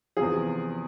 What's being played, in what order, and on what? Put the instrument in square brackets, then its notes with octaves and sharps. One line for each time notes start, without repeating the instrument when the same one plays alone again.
[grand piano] E2 C3 F3 G#4